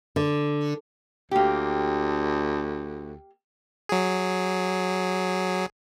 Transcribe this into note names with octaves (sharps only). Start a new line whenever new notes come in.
D3
D2 A#3 G4
F#3 G#4